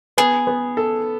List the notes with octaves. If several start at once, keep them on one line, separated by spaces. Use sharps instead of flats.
B3 G#4
B3
A4